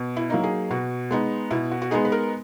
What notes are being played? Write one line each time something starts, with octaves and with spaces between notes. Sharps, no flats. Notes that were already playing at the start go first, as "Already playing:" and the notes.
Already playing: B2
E4
F#3 A#3 D#4
G#4
B2 F#4
G#3 B3 D#4
B2 E4
F#4
F#4
G#3 B3 D#4 G#4
B4
A#4